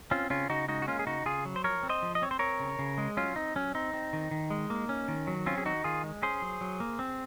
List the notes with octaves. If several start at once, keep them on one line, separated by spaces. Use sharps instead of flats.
C4 C#4 F4
C#3 C#4 F4
C#3 D#4 F#4
G#3 D#4 F#4
F#4
A#3 C#4 F4
G#4
C#3 D#4 F#4
C#3 F4 G#4
F#3
C5
F3 A#4 C#5
C4
C5 D#5
F3
D#5
C4 C#5
C5
C4 A#4 C#5
C#3
C#3
G#3
F#3 C#4 F4
C4 D#4
F#3 C#4
C4 D#4
C4
D#3
D#3
G#3
A#3
C#4
D#3
F#3
C4 C#4 F4
G#4
D#3 D#4 F#4
D#3 F4 G#4
G#3
C#4 G#4 C5
F#3
F#3
A#3
C4